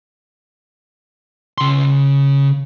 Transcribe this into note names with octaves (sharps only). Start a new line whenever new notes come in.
C#3 C6